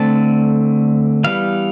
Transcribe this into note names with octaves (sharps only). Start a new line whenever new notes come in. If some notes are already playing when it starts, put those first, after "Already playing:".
Already playing: D3 A3 C4 A5
E3 G3 B3 F5